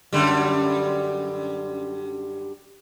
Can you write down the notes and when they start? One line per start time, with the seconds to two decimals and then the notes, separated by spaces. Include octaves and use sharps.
0.13 F#2 D3 G3